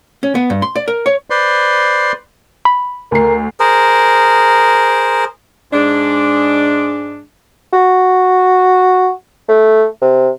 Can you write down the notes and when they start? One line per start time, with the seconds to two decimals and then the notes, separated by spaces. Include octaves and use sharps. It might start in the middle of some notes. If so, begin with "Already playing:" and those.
0.23 C#4
0.35 B3
0.50 G2
0.62 C6
0.76 D5
0.88 A#4
1.06 C#5
1.30 B4 C5 D5 C6
2.65 B5
3.12 D2 A#4 C7
3.60 G#4 A#4 C5
5.72 G#2 G#3 D4
7.73 F#4
9.49 A3
10.02 C3